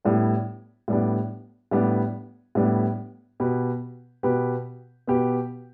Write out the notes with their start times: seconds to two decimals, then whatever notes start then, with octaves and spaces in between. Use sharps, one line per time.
0.05 A2 G3 B3 D4
0.88 A2 G3 B3 D4
1.71 A2 G3 B3 D4
2.55 A2 G3 B3 D4
3.40 B2 B3 G4 B4
4.23 B2 B3 G4 B4
5.07 B2 B3 G4 B4